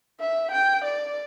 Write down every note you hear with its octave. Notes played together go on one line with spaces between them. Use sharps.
E5
G5
D5